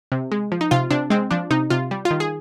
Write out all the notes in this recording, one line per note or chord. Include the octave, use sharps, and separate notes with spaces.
C3
G#3
F3
D#4
C3 F4
C3 D4
G#3 C4
F3 D4
C3 D#4
C3 F4
G3
F4
D#3
G#4